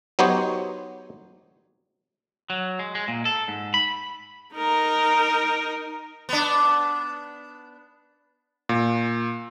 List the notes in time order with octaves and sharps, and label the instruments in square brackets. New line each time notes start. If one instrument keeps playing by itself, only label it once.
[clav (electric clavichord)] F#3 B3 D#4 G4 C5 C#5
[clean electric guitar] F#3
G#3
G#3
A#2
A4
G#2
B5
[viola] D#4 A#4
[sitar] B3 D4
[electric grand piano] A#2